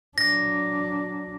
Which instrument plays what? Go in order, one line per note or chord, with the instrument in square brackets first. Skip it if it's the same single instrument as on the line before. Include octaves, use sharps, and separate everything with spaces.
[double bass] F#3 D4 [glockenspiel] A#6